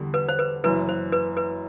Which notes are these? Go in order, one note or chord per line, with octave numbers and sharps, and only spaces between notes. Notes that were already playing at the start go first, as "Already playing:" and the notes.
Already playing: E2 D3 G3
B4
C5
B4
F#1 F#2 E3 B4
C5
B4
B4